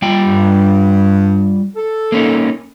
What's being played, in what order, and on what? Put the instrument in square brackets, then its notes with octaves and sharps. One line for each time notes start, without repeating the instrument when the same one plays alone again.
[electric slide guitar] G3 F4 G5
[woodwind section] G2
A4
[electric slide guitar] A#3 C#4 D#4